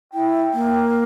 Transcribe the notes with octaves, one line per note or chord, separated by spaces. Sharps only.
E4 G5
A#3